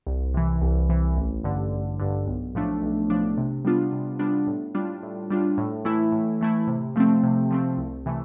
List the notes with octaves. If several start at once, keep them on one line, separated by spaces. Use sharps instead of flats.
C2
C3 E3
C2
C3 E3
A1
G2 D3
A1
G2 D3
B1
A2 F3 A3 D4
B1
A2 F3 A3 D4
C3
G3 B3 D4 F4
C3
G3 B3 D4 F4
A2
G3 D4 F4
A2
G3 D4 F4
A2
E3 A3 E4
A2
E3 A3 E4
C3
F3 A3 C4
C3
F3 A3 C4
C2
C3 E3 A3